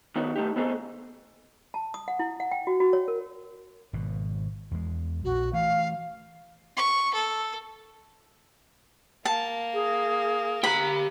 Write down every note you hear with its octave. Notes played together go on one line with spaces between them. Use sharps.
D#3 B3 D#4 F#4 C#5
A3 D#4 G4
B3 C4 D#4 F#4 G#4 A4
A5
D#6
F#5
E4
F#5
G5
F#4
F#4
C#5
A#4
G#1 B2
E2 G#3
A#1 F#4
E3 A3 F5
C#6
A4
A#3 A5
G#4
G4 A#5 B5